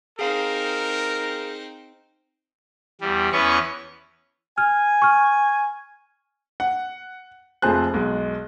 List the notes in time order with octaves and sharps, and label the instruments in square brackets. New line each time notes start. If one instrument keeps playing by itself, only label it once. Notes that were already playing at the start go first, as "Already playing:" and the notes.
[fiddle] C4 D#4 [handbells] G#4 F5 [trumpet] A#4
[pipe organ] E2 G3
E2 E3 B3 C#4 B4 C#6
[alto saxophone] G#5 [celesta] F6
[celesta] C#6 F6
[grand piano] F#5
F1 F3 C4 G#4 C5 F#6
B1 G#3